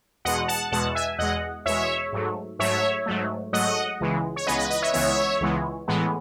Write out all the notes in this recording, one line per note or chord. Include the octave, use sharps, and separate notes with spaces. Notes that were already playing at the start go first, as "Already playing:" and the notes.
E2 B2 G#3 D#5 F#5
F#5 A5
E2 B2 G#3 F#5 A5
E5 G#5
E2 B2 G#3 D#5 F#5
E2 B2 G#3 C#5 E5
G#2 F#3 A3
G#2 F#3 A3 C#5 E5
G#2 F#3 A3
G#2 F#3 A3 D#5 F#5
C#2 C#3 E3 G#3 B3
C#5
C#2 C#3 E3 G#3 B3 B4 D#5
B4 D#5
B4 D#5
C#5 E5
C#2 C#3 E3 G#3 B3 C#5 E5
C#2 C#3 E3 G#3 B3
A2 E3 G#3 B3